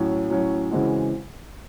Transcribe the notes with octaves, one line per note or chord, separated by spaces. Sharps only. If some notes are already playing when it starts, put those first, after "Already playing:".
Already playing: A2 F#3 C#4
A2 F#3 C#4
C#3 E3 G#3 C4 F#4